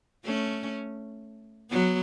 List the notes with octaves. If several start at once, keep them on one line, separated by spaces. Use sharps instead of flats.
A3 C#4
F#3 B3